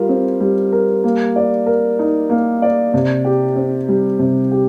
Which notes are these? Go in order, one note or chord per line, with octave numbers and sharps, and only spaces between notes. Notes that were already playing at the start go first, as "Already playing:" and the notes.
Already playing: G3 F4 A#4
C4
G3
A#4
A#3
D5
A#4
D#4
A#3
D5
C3
G4
C4
G3
C3
G4